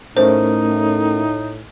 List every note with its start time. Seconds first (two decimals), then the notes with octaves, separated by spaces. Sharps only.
0.17 A2 A3 C#4 D#4 A#4 C5